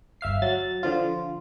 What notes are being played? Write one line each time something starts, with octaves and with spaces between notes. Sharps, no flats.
G1 E5 F5 C7
F#3 A6
D3 F3 F4